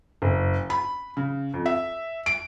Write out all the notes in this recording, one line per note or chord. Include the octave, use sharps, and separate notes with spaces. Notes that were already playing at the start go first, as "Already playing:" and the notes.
F#1
B5
C#3
F2
E5
D7